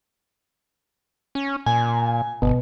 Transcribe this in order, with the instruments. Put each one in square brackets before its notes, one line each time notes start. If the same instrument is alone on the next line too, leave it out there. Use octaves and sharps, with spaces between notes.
[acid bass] C#4
[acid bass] A#2 [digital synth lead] G#5
[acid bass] G1 [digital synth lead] B2